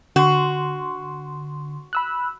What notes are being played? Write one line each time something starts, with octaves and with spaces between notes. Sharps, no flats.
D3 F#4 C6
B5 E6 F#6